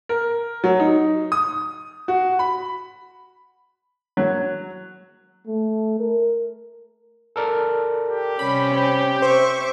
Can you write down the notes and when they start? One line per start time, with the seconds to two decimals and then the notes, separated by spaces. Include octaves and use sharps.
0.09 A#4
0.64 F#3
0.80 D#4
1.32 D#6
2.08 F#4
2.39 B5
4.17 F#3
5.47 A3
5.99 A#4
7.36 A4 A#4 D5
8.08 G4
8.39 C3 G3 C#4 B5
8.71 C4
9.22 C5 E5 C#6 D6